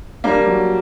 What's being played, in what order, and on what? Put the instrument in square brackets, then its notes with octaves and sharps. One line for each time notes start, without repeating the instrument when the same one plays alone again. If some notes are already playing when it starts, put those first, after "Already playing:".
[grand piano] G3 A#3 [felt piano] D4
[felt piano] F#3